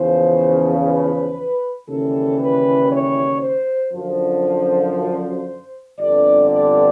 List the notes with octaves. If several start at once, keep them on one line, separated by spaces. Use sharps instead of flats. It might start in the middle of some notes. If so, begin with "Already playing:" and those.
Already playing: E2 C#3 F3 C5
B4
D#2 C#3 E3 G3 A4
B4
C#5
C5
F#2 D3 F3
C5
G1 F2 D3 D5
D5